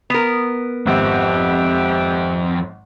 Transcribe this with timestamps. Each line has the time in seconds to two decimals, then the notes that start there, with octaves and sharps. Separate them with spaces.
0.10 B3 A#4
0.86 G#1 F2 C4 G4 B4 E5